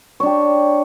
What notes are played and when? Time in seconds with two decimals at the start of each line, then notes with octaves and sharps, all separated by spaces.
0.20 C#5
0.23 D4
0.26 G4